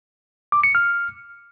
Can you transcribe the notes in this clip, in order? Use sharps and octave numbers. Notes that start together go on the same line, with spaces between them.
D6
C#7
F6